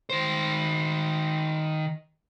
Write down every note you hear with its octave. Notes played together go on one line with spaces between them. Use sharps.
D#3 C5